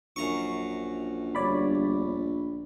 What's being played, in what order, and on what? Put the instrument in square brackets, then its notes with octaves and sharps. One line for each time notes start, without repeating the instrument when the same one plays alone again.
[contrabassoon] A#1 [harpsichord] F#2 A#5 C#6
[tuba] G1 [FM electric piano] C#5 D5 B5